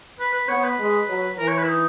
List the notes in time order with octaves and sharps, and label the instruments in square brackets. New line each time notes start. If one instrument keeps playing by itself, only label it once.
[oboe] B4
B4
[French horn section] B3 [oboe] C#5
[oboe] B4
[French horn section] G#3
F#3
[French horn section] E3 [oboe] A#4
[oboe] C#5
B4
E4
D#4